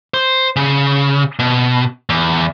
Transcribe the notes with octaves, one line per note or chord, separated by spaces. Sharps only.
C5
C#3
B2
E2